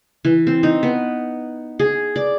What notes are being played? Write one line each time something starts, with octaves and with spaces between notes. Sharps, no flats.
E3
C4
D#4
B3
G#4
D5